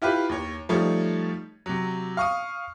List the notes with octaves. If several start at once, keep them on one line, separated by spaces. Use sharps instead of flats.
E4 F4 G4 B4
D#2 C#5
F3 G3 A3 D#4 C#5
C3 F#3
F5 C#6 D#6